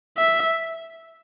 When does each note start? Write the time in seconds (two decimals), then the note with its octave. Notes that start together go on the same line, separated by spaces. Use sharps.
0.17 E5